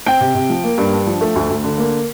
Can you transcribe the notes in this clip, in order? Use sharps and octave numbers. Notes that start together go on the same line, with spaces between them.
C4 G5
C3
C3
F3
A#3
G2
D4
F3
A3
D2
D2
D3
A#3